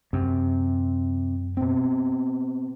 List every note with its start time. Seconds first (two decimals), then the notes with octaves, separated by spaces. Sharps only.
0.13 F#2 C3
1.57 B2 C4